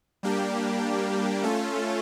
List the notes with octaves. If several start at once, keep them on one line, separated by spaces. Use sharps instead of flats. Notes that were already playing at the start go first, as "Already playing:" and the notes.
G3 A#3 D4 G4
A3 C#4 F4 A4